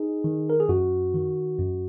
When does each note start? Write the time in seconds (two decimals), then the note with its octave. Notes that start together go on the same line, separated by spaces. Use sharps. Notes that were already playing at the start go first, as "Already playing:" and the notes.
Already playing: D#4 G#4
0.24 D#3
0.50 A#4
0.60 G#4
0.69 F#2 F#4
1.14 D#3
1.59 F#2